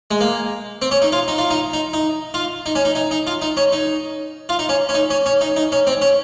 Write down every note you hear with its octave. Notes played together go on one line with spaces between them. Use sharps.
G#3
A#3
C4
C#4
D#4
F4
D#4
F4
D#4
D#4
D#4
F4
D#4
C#4
D#4
D#4
D#4
F4
D#4
C#4
D#4
F4
D#4
C#4
C#4
D#4
C#4
C#4
D#4
D#4
C#4
C4
C#4